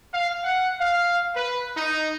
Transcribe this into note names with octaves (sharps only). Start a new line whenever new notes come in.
F5
F#5
F5
B4
D#4